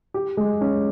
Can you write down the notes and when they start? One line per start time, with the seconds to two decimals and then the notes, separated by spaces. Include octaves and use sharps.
0.14 G4
0.37 G#3
0.61 C#4